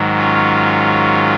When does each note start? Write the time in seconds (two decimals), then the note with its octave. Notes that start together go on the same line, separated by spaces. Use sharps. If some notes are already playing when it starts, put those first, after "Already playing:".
Already playing: G#2 D#3 F#3
0.16 C#4 F4